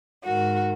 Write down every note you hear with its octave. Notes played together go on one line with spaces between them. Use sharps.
G#2 D#3 F#4